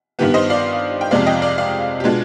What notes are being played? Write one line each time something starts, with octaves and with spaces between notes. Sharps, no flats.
G2 D#3 B3 G4
C5 D#5
D5 F5
G5
F2 C3 F3 G#3 C4 D5 F5
D#5 G5
D5 F5
D5 F5
G4
B2 G#3 D4 F4